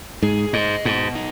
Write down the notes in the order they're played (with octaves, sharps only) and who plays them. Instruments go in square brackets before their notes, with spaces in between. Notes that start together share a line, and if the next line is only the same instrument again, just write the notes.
[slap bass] G#2 [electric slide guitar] G#4
[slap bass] G#2 [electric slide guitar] D#5
[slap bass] G#2 [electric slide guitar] B2
[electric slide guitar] D#4